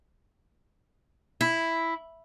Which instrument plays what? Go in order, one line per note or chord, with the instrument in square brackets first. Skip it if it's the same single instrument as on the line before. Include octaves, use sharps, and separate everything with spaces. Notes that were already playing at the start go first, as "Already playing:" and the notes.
[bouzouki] E4